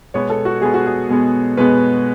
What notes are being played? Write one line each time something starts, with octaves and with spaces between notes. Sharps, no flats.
B2 G#3 B3 C#5
A4
F#4
B2 G#3 B3 G#4
F#4
G#4
B2 G#3 B3
B2 G#3 B3 B4